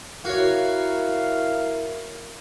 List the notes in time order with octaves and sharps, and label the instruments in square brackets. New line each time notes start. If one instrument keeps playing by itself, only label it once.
[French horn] E4 [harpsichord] F#4 C#5 [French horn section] A#4 [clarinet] F5